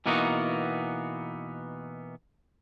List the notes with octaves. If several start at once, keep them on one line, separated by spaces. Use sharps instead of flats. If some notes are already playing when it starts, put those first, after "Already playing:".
B2 E3 A#3 B3 D#4 F#4